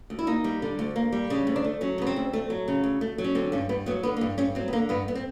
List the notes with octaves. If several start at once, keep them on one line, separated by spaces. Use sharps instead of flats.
D2
E4
A#3 D#4
G3
D3
D2
A#3
G3
C#3 D4
D2
D4
A3
F#3 C#4
C#3 B3
C4
D2
A3
F#3
C#3
D2
A3
F#3
C#4
D3 C4
G2 C#4
G2 B3
F#3 B3
D3 B3
A#3
G2 B3
G2 C#4
F#3 C4
B3
D3 A#3
G2 B3
B3
C4